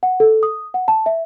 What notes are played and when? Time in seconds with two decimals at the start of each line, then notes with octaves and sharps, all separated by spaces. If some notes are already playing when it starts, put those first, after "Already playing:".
0.03 F#5
0.20 A4
0.43 D#6
0.74 F#5
0.88 A5
1.06 E5